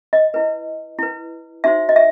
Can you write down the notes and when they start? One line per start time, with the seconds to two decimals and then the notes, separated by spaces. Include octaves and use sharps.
0.13 D#5
0.34 E4 B4
0.99 E4 B4
1.64 D#4 F#4 C5 E5
1.89 D#5
1.96 E5